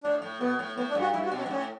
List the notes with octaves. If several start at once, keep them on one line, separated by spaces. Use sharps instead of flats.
A2 D4
A2
B2 B3
A2
A2 B3
D4
G2
F#4
G2 E4
F#4
B2
C#4
G2
A2 C#4